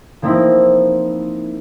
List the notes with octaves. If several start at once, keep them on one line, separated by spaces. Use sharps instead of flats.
F3 A#3 C4 D#4 E4